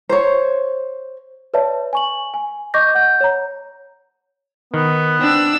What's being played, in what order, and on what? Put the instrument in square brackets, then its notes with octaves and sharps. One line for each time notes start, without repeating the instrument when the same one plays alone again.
[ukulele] C5 C#5
[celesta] B4 C#5 D5 E5 A5
G#5 C#6 F#7
G#5
D#5 C#6 D6 G6 A#6
F#5 G6
C#5 A#5
[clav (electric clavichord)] D#3 [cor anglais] B3
[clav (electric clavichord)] C4 [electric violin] D4 E6